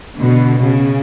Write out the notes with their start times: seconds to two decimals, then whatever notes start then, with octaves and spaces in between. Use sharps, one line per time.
0.18 B2 D3
0.63 C#3